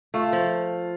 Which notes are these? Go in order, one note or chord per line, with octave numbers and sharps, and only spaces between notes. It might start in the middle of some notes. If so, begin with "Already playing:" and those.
A3 F4
F3